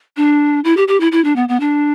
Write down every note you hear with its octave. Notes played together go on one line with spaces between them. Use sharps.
D4
E4
G4
G4
E4
E4
D4
B3
B3
D4